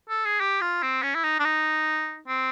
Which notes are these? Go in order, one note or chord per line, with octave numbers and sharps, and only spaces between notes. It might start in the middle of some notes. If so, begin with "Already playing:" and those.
A4
G#4
G4
F4
C4
C#4
E4
D#4
D4
D#4
C4